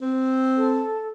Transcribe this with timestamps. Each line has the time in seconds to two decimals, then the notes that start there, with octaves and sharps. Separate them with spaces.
0.01 C4
0.56 A4